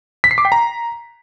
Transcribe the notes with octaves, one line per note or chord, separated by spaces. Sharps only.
B6
C7
D6
G5
A#5